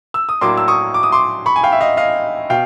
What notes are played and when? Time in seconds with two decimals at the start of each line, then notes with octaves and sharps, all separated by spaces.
0.14 E6
0.29 D#6
0.41 A2 F#3 A#3 D4 C6 D6
0.57 E6
0.68 C#6 D#6
0.94 D6
1.03 D#6
1.12 C6 D6
1.46 B5 C#6
1.56 G#5
1.64 F5 G5
1.72 E5
1.81 D#5 F5
1.97 D#5 F5
2.50 B2 F5 G5